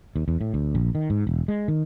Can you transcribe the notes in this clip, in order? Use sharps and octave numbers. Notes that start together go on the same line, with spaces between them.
D#2
E2
A2
D2
A#1
D#3
G#2
E1
G#3
D#3